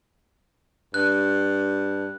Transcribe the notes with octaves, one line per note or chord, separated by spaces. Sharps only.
G2 F#6